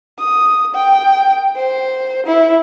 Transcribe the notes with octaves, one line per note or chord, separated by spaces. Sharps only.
D#6
G5
C5
E4